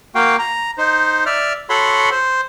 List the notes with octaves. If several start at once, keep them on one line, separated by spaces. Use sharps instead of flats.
A#3 F#4 F5 G5
A#5
D#4 C5
D5 E5 F6
F#4 A4 C#5 F#5 B5 C6
C5